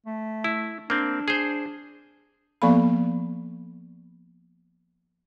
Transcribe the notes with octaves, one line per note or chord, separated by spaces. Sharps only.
A3
E4
A#3 C4 D4
G#4 C5
F3 A#3 B3 A4 F5 B5